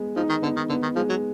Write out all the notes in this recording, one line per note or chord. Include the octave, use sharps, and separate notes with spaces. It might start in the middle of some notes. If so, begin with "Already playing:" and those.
Already playing: G#3 B3
F3 D#4
D#3
D3 B3
D#3
D3 B3
D#3
F3 G#3
F#3